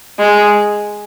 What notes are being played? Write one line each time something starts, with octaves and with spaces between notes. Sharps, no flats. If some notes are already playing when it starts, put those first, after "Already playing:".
G#3